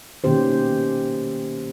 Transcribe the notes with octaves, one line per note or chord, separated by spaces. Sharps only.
B2 D#3 A#3 C#4 G4 C5